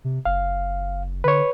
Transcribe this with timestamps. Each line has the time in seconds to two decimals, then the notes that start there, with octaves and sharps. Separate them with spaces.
0.04 C3
0.25 F#1 F5
1.24 D3 B4 C#5